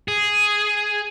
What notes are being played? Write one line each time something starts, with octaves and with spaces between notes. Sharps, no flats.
G#4